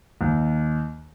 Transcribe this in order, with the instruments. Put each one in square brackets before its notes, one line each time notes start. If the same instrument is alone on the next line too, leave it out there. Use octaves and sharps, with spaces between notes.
[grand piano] D#2